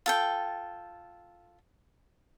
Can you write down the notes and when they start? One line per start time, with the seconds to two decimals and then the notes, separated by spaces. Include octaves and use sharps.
0.06 F4 A4 G5